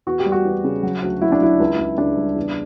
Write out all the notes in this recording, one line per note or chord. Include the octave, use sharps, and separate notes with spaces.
E2 F#4
G4
G3
F#4
E2
C#3
F#3
D2
F#3 E4
D4
F#3 E4
C#2
C#2
C#3 D4
G3
E2